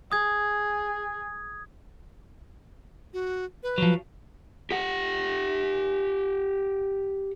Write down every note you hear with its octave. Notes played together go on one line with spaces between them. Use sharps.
G#4 D#6 G#6
F#4
B4
F3 F#3
G4 F#5